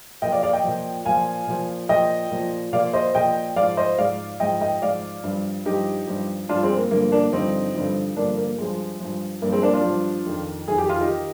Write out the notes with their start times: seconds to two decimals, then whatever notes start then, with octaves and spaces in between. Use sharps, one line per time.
0.22 A#2 D#5 G5
0.26 F3
0.32 D5 F5
0.43 D5 F5
0.53 D#5 G5
0.64 A#2 F3
1.05 A#2 F3 F5 G#5
1.47 A#2 F3
1.89 A#2 F3 D#5 G5
2.31 A#2 F3
2.73 A#2 F3 D5 F5
2.93 C5 D#5
3.14 A#2 F3 D#5 G5
3.56 G#2 F3 D5 F5
3.77 C5 D#5
3.98 G#2 F3 D5 F5
4.40 G#2 F3 D#5 G5
4.61 D#5 G5
4.82 G#2 F3 D5 F5
5.24 G2 F3
5.66 G2 F3 D#4 G4
6.08 G2 F3
6.49 G2 F3 D4 F4
6.63 G#3 C4
6.77 A#3
6.91 G2 D3 F3 A#3
7.12 A#3 D4
7.33 G2 D3 F3 C4 D#4
7.75 G2 D3 F3
8.17 G2 D3 F3 A#3 D4
8.37 A#3
8.58 G2 F3 G#3
9.00 G2 F3
9.42 G2 F3 A#3
9.52 G#3 C4
9.63 A#3 D4
9.73 D4 F4
9.84 G2 F3
10.26 F2 D#3
10.68 F2 D#3 G#4
10.78 G4
10.89 F4
11.00 D#4 G4
11.09 D#3